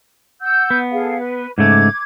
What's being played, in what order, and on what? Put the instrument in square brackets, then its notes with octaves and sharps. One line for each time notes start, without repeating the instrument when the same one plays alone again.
[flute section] F#5 E6 G6
[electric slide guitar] B3
[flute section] G#4 A4 F5
B4
[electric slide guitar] G#2 C#3 A3 [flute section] D6 G#6